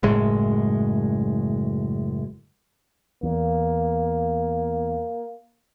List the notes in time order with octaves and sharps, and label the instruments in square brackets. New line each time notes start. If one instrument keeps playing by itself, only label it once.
[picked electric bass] F#1 A2 G#3
[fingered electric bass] E2 [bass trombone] A#3